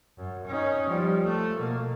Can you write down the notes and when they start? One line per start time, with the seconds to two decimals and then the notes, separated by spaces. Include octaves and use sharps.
0.17 F#2
0.47 C#4 D#4
0.87 F3 G3
1.23 A3
1.56 B2 A#3